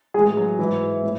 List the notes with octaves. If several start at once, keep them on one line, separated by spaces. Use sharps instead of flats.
A2 E3 G#3 G#4
F#3 F#4
G#2 E3 E4
A2